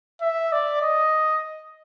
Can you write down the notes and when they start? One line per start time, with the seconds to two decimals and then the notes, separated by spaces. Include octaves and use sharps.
0.22 E5
0.52 D5
0.82 D#5